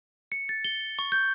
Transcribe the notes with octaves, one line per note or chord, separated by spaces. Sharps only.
C#7
A6
G7
C#6
G6